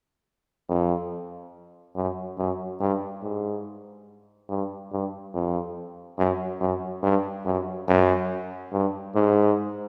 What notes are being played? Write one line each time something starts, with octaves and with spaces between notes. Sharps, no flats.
F2
F#2
F#2
G2
G#2
G2
G2
F2
F#2
F#2
G2
F#2
F#2
G2
G#2